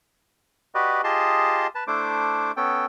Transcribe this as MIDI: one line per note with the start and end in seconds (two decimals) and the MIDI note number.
0.75 1.01 66
0.75 1.01 67
0.75 1.01 71
0.75 1.01 74
0.75 1.01 75
1.04 1.67 65
1.04 1.67 67
1.04 1.67 68
1.04 1.67 75
1.04 1.67 81
1.04 1.67 84
1.75 1.84 71
1.75 1.84 81
1.87 2.52 57
1.87 2.52 62
1.87 2.52 64
1.87 2.52 72
1.87 2.52 86
2.57 2.86 59
2.57 2.86 61
2.57 2.86 69
2.57 2.86 79